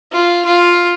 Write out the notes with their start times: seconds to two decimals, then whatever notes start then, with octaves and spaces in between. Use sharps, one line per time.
0.12 F4
0.45 F4